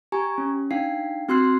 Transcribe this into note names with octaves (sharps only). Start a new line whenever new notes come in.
G4 G#5 A#5 C#6
C#4
D4 D#4 F5 G5 C7
C4 F#4 C6 E6 F#6 C7